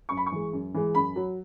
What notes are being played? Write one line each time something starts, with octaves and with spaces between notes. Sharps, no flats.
F#2 C#6
B5
C#6
E3 G#3
F#2
E3 G#3
F#2 B5
F#3